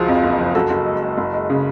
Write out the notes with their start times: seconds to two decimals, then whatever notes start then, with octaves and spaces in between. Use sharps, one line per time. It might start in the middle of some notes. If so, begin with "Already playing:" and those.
Already playing: C#2 F3 F4 F#4 G#4
0.08 F2
0.24 F#1
0.39 F3
0.55 F#2 F#4 A4
0.70 F#1
0.86 G#3
1.02 G#3
1.18 F#1
1.33 G#3
1.50 C#3